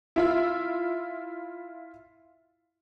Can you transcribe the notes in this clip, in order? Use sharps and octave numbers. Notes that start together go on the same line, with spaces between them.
E4 F4 E5